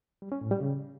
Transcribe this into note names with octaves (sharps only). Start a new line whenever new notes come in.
G3
C#4
A2
G3
C#3